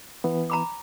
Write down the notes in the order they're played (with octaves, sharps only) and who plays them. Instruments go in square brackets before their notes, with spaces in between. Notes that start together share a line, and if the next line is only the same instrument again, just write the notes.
[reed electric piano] E3 B3
[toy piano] A#5 B5 D6